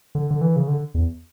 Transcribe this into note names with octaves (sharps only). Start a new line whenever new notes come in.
D3
D3
E3
C#3
D3
E2